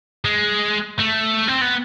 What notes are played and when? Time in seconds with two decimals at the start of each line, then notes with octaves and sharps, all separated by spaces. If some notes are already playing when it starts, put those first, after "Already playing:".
0.25 G#3
1.00 A3
1.48 C4
1.61 B3